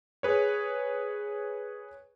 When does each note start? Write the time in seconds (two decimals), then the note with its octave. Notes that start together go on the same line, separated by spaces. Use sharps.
0.23 G#4 B4 C#5